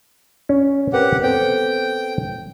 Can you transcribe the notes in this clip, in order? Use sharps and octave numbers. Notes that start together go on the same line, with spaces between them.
C#4
C4 G4 A#4 B4 F#5
B3 C4 A4 G5